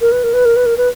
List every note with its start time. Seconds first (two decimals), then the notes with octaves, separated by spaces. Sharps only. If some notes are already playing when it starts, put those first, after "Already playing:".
0.01 A#4
0.12 B4
0.23 A#4
0.33 B4
0.45 A#4
0.56 B4
0.66 A#4
0.77 B4